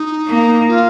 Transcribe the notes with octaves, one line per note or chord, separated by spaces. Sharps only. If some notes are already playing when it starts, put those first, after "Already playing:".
Already playing: D#4
A#3
F4